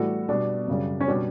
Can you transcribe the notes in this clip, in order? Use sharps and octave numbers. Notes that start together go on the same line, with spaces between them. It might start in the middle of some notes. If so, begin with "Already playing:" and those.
Already playing: A2 E3 G3 F#4 A4
B2 G3 D4
F#2 C#3 G3
C#4
B2 G3 D4